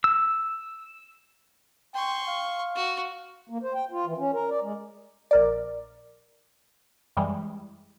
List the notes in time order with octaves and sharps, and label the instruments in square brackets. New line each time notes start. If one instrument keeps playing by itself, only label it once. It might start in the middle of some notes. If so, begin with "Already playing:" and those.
[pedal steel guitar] E6
[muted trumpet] G5 [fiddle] C6 C#6
[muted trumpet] F5
[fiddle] F#4
[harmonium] A#3
C5
G5
F4
E3
C#4
A#4
D5
G#3
[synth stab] A#1 A#4 D5
F#2 E3 G3 G#3